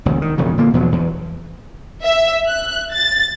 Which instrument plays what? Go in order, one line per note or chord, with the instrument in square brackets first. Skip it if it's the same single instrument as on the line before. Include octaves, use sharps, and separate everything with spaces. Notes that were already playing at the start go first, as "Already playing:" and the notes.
[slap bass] E1 D2
D#3
E1 F2 C#3
A#2 D3 A#3
E2 B2 F3 F#3
E2
[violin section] E5
F#6
A6